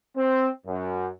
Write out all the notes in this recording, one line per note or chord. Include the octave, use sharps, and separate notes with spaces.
C4
F#2